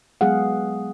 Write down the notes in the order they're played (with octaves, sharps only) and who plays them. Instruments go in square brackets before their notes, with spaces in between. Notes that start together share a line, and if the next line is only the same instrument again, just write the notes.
[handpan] F#3 G#3 B3 G#4 F5 F#5